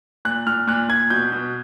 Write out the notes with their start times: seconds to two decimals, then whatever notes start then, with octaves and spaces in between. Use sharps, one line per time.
0.25 A#2 F#6
0.47 A#2 F6
0.67 A#2 F#6
0.89 A#2 G#6
1.10 B2 G6
1.32 B2